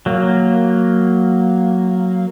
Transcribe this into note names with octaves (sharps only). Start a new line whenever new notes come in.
F#3 A#3